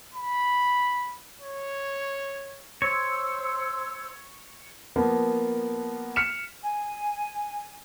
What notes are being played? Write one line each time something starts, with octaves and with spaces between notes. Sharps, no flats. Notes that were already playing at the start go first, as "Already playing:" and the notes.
B5
C#5
C5 C#5 C6 E6
F3 A#3 B3
F6 B6 C#7 E7
G#5